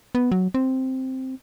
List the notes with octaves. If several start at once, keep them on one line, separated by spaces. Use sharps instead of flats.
B3
F#3
C4